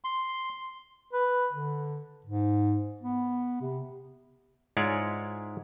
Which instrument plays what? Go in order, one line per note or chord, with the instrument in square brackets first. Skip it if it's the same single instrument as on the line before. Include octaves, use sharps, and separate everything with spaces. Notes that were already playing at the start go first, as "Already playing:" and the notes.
[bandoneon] C6
[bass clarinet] B4
D3
G#2
B3
C3
[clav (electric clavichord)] G#2 G#3 E4 F4 C#5 D5